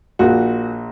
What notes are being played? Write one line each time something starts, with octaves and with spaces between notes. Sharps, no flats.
A#1 A#2 F#4